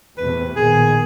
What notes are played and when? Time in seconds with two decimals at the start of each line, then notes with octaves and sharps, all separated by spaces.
0.18 E2 C3 A3 B4
0.56 A#1 B2 D#3 G#4